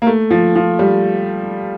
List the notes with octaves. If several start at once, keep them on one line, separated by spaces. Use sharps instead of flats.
A#3
A3
F3
F3
G3